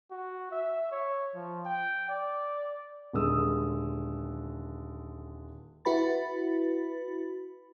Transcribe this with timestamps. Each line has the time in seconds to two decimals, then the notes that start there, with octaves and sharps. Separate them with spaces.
0.11 F#4
0.52 E5
0.92 C#5
1.35 F3
1.66 G5
2.09 D5
3.13 D#1 D3 G#3 D#6 E6
5.85 E4 F#4 B4 B5 A6